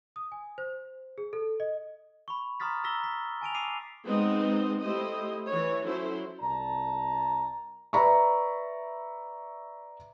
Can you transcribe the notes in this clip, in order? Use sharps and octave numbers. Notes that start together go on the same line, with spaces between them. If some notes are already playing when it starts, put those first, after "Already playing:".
D#6
G#5
C5
G#4
A4
D#5
B5 C#6
A#5 C6 D#6 F6 A6 B6
A#5 E6 A#6 B6 G7
B6
G#5 A5 D7 F7
D6 E6 C7 D#7 F7
G#3 B3 C4 D#4 C5 D#5
A3 E4 G4 C5 D#5
E3 C#5
F#3 C#4 E4 A4 C5
C2 A#4 D5 A5 A#5
B4 D5 E5 A#5 B5 C#6